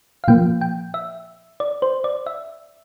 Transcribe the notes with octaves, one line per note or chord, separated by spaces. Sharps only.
F5
A#2 F3 A#3 G5
G5
E5
D5
C5
D5
E5